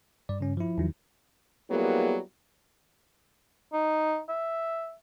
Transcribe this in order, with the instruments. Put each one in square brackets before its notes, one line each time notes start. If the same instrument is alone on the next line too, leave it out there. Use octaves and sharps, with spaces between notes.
[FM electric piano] G2 [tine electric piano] D5
[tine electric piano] C#3 C#4
F3 E4
[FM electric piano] E2 D#3 F#3
[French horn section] F#3 G3 A#3 B3 E4 G#4
[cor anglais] D#4
E5